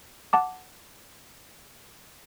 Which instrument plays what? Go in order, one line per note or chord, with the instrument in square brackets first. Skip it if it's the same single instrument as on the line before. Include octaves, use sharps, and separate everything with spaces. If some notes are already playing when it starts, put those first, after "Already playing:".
[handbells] F#5 A5 D6